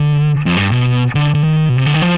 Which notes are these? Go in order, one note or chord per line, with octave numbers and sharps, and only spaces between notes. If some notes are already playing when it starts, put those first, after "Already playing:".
Already playing: D3
F2
G2
B2
D3
D3
D#3
B2
C3
D3
D#3
F3